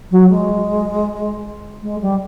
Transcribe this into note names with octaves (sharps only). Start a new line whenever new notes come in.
F#3
G#3
G#3
G3